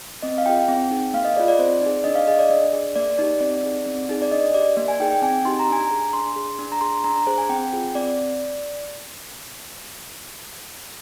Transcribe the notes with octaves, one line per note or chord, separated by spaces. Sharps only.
C4 D#5
F5
F4 G#4 G5
C4
D#4 G#4
A#3 F5
D#5
F4 G#4 D5
D5
C4 C5
D#4 G#4 D5
D4 D#5
F5
G#4 D#5
D5
D4
G#4
A#3 D5
D#4 G4 D5
C4 D5
D#4 G#4
C4
D#4 G#4
D5
D4 D#5
G4 D5
A#3 D5
G#5
D#4 G#4 G5
G5
C4 G#5
D#4 G4 C6
A#5
D4 G#5
G#4 A#5
D4 C6
G#4
D4
A#5
G#4 C6
D4 A#5
A#5
G#4 C5
G#5
C4 G5
F4 G#4
C4 D5